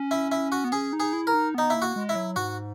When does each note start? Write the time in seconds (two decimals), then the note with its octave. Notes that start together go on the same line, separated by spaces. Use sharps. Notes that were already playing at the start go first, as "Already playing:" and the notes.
Already playing: C#4
0.11 E4
0.32 E4
0.52 F#4
0.64 B3
0.72 C#4 G#4
0.93 D#4
1.00 G#4
1.13 E4
1.27 A#4
1.34 D#4
1.55 B3 D#4
1.70 A#3 E4
1.82 F#4
1.96 G#3
2.09 E4
2.16 F#3
2.36 G#2 F#4